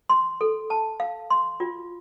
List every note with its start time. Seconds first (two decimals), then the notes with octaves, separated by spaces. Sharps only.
0.09 C6
0.41 A4
0.70 A5
1.00 F5
1.30 C6
1.60 F4